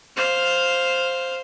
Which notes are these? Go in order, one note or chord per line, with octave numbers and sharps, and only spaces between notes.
C5 F5